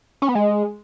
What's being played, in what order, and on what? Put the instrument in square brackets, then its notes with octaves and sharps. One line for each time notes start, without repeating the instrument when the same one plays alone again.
[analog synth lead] C#4
B3
G#3